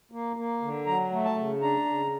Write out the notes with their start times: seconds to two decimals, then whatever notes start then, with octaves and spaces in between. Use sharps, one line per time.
0.12 A#3
0.36 A#3
0.62 D3
0.86 F#3 A#5
1.12 A3
1.25 A5
1.36 C#3
1.62 D4 A#5
1.86 C#3